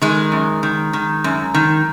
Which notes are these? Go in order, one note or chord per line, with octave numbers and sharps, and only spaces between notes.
D#3 G#3
F#2
D#3
D#3
F#2
D#3